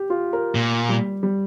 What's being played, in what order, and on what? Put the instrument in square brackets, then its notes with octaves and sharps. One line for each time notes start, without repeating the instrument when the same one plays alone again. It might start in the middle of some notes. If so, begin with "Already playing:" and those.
Already playing: [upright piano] G4
F4
A#4
[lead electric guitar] A#2
[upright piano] G3
G3